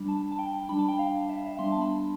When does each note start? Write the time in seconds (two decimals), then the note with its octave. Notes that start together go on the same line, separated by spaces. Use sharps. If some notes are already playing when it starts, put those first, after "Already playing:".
Already playing: G3 D4 B5
0.08 A5
0.32 A5
0.39 G5
0.69 G3 D4 B5
0.79 A5
0.88 G5
0.99 F5
1.29 E5
1.37 F5
1.46 E5
1.59 G3 B3 D4 C6
1.72 A5
1.81 B5